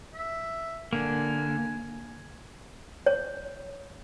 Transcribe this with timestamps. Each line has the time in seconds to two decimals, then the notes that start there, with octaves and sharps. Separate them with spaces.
0.14 E5
0.93 D3 A#3 G#5
3.06 C#5